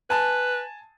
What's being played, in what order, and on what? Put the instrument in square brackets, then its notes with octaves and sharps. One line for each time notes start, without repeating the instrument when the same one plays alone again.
[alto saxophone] B4 [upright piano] G#5 A5